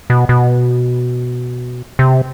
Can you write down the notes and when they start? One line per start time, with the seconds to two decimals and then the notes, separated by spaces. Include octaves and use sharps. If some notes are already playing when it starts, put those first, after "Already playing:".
0.10 B2
0.29 B2
1.99 C3